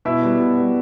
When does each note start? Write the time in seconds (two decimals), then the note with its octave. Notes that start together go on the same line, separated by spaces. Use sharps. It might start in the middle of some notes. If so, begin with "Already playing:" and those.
0.05 B2 E4 E5
0.22 G3 B3
0.40 B2
0.57 G3 B3